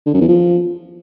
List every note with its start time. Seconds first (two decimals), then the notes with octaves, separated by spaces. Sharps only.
0.06 D3
0.13 F#2
0.21 E2
0.28 F3